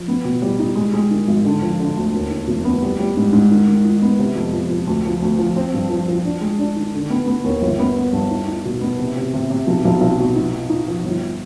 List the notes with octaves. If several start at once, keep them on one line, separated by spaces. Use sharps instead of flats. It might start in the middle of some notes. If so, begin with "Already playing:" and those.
Already playing: F3
B3
B2
G3
D#4
G#3
G#3
D#3
G#1
D3
F3
D3
D2
D#2
D#3
F1
B3
G3
G3
G#2
G#2
D#3
D#3
D#4
B3
C3
F2
F3
F3
D2
F3
D2
F3
C4
G2
F3
F3
D4
G#3
D4
D#3
D3
B3
B3
D#2
G1
B3
B3
G2
D#4
D#4
B2
B3
C3
C3
C3
C3
B1
B1
B1
B2
D#4
D#4
D#4
F3
G1